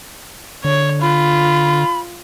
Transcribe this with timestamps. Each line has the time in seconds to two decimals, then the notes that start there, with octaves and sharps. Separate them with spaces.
0.65 D3 C#5
1.02 F4 B5